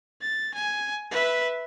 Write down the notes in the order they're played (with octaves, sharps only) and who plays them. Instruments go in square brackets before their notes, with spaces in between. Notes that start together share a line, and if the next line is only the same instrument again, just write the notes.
[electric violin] A6
G#5
B4 E5